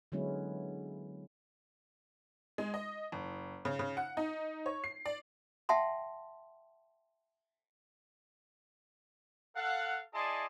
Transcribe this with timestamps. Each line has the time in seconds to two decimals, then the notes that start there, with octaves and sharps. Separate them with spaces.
0.12 D3 F#3 G#3 B3 C#4 E4
2.58 G#3
2.74 D#5
3.12 F#1
3.65 C#3
3.79 C#3
3.97 F#5
4.17 D#4
4.66 C#5
4.84 C7
5.06 D5
5.69 E5 F#5 G5 A5 C6
9.56 A4 F5 F#5
10.14 E4 G#4 D5 D#5 A5 C6